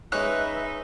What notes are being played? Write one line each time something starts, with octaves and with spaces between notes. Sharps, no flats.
G#3 C#4 D#4 B4 E5 F#6